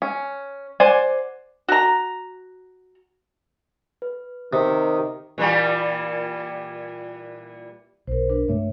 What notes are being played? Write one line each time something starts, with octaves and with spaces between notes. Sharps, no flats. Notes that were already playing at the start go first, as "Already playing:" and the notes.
C#4
C5 D5 F#5 G#5
F#4 A#5
B4
C3 D#3 D#6
A#2 E3 G3
B1 A#4 C5
D4 A#4 B4
G2 C3 A3 C#5 E5